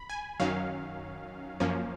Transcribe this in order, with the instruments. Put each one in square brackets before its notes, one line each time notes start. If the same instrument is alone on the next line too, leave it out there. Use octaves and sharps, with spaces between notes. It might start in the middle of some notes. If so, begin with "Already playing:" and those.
Already playing: [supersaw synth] B5
G#5
F#2 D#3 F#3 C#4 F5
F#2 F3 A#3 C#4